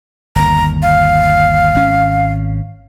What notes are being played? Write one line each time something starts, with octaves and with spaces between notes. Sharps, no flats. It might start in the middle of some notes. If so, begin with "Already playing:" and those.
G1 D#2 A#5
F5
G#1 C#4